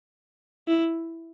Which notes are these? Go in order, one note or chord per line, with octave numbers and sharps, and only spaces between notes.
E4